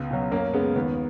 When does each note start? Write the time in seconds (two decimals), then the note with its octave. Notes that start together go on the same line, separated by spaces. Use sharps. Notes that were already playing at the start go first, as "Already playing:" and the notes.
Already playing: C#2 B3
0.10 B2 F#3
0.31 F#2 A#3 C#4
0.54 C#3 G#3 B3
0.76 D#2 B3